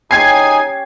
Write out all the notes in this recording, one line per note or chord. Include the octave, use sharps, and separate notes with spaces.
C#4 D#4 G4 G#4 G5 G#5 G#6 C7